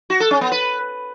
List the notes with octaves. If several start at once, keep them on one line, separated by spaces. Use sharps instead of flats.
F#4
A4
C#4
B3
B4